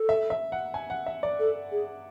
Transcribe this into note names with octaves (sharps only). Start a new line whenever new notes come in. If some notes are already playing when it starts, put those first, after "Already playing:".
Already playing: A4
E5
E5
F#5
G#5
F#5
E5
D5
A4
G#4